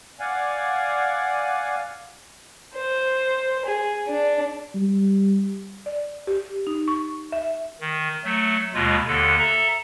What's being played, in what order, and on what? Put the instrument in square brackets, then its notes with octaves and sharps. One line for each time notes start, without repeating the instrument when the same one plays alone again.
[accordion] D5 F5 F#5 G#5
[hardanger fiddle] C5
G#4
D4
[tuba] G3
[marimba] D5
G4
D#4
C#6
E5
[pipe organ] D#3
F#3 A3
D#2 B2 G#3 F4
D#2 D3 A4
A4 E5 A#5